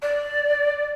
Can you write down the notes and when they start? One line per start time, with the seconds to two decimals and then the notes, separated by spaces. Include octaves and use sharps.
0.02 D5